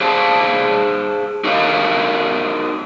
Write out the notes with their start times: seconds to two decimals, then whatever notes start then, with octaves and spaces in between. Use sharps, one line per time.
0.01 G#4 C5 F5 A5
1.44 D#4 F#4 A#4 C#5 D#5 F5